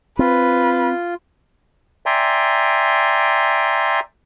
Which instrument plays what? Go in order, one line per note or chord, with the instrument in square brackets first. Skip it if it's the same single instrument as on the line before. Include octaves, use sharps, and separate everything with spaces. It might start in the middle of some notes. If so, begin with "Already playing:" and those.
[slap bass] C4 [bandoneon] F4 [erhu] B4
[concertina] D5 E5 G5 G#5 A#5 C6